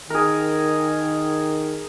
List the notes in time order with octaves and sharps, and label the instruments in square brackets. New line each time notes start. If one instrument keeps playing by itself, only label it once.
[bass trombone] D#3 [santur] G#4 A#4